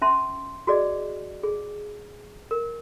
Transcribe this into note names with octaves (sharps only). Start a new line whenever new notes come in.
C#4 E5 A5 C6
F#4 G#4 D5 D#5
G#4
A#4